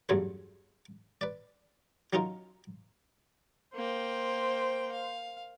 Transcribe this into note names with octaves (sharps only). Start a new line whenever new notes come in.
E2 G2 C#3 F#3 A3 C#5
B4 D5
F#3 C#4 D#4 F4 A#4
A#3 C5 G5
F5